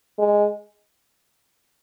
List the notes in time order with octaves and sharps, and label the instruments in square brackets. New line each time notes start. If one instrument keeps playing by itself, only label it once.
[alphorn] G#3